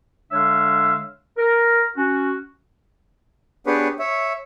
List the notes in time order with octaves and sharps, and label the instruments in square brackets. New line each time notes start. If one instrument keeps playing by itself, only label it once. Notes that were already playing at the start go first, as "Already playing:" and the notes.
[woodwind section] D3 G#3 D4 C#5 E5 F5
A#4
C#4 F#4
[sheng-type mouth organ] B3 D4 G4 G#4 B4 C#5
C#5 E5